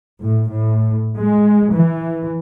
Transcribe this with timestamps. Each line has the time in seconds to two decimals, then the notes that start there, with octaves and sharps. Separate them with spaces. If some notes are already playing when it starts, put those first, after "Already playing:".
0.21 A2
0.51 A2
1.16 G#3
1.72 E3